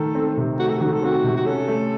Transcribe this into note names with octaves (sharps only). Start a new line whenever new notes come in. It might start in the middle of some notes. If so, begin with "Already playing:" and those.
Already playing: D#3 A3 A4
C4
C3
A3 F#4
A4
D#3 F#4
A4
C4 F#4
C3
F#4
C#4 A4
A3